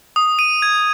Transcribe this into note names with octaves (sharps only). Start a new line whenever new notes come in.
D#6
D#7
G#6